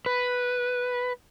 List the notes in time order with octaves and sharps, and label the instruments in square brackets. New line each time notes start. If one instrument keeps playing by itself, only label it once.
[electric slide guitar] B4